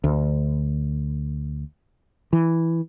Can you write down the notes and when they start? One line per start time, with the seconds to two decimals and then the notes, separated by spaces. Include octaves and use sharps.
0.04 D2
2.33 E3